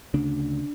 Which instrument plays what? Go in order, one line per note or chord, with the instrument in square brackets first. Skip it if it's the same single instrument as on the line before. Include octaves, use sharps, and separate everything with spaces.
[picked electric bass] D2 C#3 D4